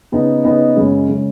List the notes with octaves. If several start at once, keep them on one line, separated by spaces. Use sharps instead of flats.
C#3 B3 D#4
C#3 B3 D#4
F#2 C#3 G#3
C#3 G#3